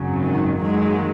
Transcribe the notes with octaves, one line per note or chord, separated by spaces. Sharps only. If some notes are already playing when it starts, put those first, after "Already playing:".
Already playing: G#1 F#2 C#3 F#3
D#3
F#2 D#3 F#3 G#3 A#3